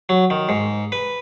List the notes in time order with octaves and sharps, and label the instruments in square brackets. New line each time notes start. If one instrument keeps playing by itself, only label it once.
[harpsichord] F#3
D#3
G#2
B4